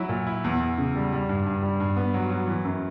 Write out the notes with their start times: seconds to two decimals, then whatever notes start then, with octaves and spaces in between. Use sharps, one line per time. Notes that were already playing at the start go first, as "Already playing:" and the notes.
Already playing: F#3 E4
0.09 A#2
0.27 E4
0.44 E2
0.60 E2
0.78 C#3
0.95 G3
1.12 G3
1.29 G2
1.46 G2
1.62 G3
1.80 G2
1.96 B3
2.14 F#3
2.30 F#3
2.48 E3
2.65 F#2